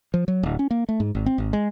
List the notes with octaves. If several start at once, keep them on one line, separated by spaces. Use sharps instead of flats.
F3
F#3
D1
C#4
A#3
A3
G#2
G#1
C4
G#1
G#3